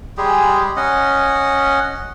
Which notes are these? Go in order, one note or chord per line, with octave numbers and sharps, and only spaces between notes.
G3 G#3 G4 G#4
C#4 D#5 F#5